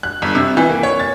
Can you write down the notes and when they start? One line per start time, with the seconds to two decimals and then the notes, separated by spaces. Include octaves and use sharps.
0.03 F#6
0.22 G1
0.35 C3
0.57 E3
0.69 A#3
0.83 C#5
0.99 A6